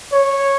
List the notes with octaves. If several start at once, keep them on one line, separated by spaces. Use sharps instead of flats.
C#5